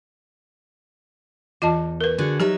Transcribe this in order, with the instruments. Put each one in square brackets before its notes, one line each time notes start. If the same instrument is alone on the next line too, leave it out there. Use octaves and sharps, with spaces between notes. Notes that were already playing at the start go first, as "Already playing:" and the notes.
[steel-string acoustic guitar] E2 [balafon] F4 D#5 A5
[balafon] A#4 B4
[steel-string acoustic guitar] D3 F#4 G#4
[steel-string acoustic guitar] F#3 D#4 E5 [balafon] G4